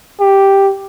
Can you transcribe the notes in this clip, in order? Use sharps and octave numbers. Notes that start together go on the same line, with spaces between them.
G4